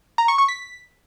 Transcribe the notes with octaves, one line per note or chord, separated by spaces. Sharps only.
A#5
C#6
C#6
B6